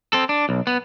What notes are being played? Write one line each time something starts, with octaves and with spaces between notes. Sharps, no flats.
C4 A4
D4
B1
B3